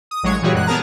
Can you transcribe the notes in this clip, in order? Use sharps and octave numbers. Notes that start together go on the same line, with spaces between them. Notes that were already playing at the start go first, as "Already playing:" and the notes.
D#6
A1 F#3 G#3 C#5 C#6 G#6
A#2 E3 G3 F#4 G#4 C#5
F#2 G#3 F#6
B3 G#4 A#4 A5 A#5